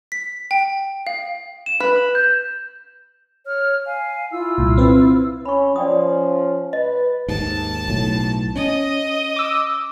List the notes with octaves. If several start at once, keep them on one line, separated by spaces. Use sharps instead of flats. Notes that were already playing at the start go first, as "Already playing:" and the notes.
B6
G5
F5
E7
B4
G6
C#5 F6
F5 G#5
E4 F4 E6
C2 A#2
C4 B4
C#4 B5 C#6
F3 C#4 D5 G5 D#6
B4 D#5
D#2 G#2 A5
B1 A2
C#4 D#5
D6 E6